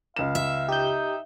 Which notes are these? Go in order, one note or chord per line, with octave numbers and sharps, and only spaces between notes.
C#2 F5 E7
E5
D#4 G4 G6